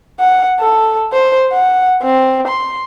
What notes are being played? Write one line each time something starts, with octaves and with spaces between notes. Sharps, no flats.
F#5
A4
C5
F#5
C4
C6